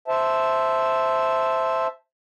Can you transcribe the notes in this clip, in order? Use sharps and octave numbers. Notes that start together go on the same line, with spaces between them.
C5 E5 A5